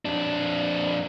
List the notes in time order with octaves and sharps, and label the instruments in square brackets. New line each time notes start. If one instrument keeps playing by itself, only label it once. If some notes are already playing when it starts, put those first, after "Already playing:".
[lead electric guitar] F2 D4